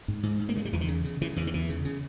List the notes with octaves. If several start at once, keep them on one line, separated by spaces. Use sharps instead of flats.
G#2
G#2
G#2
A#3
C#3 G#3
G3
E2 E3
D#3
C#3
C#3
C#3 E3
E2 E3
D#3
E2 E3
C#3
C#3